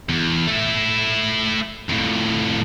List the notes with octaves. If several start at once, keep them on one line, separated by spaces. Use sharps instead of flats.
E2
A3 E4
F2 A2